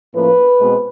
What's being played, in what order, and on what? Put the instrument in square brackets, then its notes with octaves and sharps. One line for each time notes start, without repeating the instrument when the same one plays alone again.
[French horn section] A2 F3 A#3 C#4 B4
B2 G#3 C4